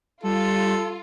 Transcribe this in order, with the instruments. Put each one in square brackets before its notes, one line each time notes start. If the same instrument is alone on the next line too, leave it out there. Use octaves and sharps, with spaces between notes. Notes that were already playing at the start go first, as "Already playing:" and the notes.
[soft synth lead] G3 [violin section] F4 [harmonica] A4